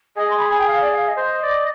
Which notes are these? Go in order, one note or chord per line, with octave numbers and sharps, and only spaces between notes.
G#4 D#5
C6
B5
G#5
G5
F5
D5
F5
F5
D#5
C5
D5